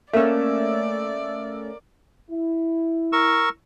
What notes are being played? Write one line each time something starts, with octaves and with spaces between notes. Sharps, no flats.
A3 A#3 C#4 D5 E5 E6
E4
A#4 C#6 E6